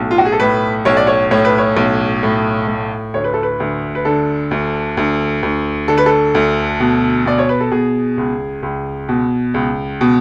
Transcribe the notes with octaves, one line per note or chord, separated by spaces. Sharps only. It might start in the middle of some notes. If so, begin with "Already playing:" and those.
Already playing: B1 A2
F4
F#4
G#4
A4
A2 B4
B1 C#5
D5
C#5
A2 C#5
B4
C#5
B1
A2
A2
D2 C#5
B4
A4
B4
D2
B4
D3 A4
D2
D2
D2
D3 A4
B4
A4
D2
B2
B2 D5
C#5
B4
A4
B2 G#4
C#2
C#2
B2
C#2
B2